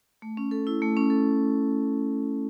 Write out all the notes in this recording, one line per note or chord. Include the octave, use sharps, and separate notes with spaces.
A3
C#4
A4
E4
A3
C#4
A4